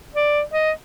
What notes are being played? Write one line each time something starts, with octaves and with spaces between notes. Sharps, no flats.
D5
D#5